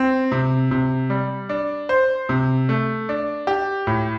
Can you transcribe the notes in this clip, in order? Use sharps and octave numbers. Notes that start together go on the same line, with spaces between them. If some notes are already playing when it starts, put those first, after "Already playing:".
Already playing: C4
C3
C3
G3
D4
C5
C3
A3
D4
G4
A2